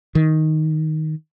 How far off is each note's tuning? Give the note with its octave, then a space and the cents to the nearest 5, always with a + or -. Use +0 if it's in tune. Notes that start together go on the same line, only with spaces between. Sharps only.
D#3 +5